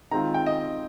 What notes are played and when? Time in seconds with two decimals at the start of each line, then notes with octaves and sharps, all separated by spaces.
0.11 D#3 G#3 C4 F4 A#5
0.34 G5
0.46 D#5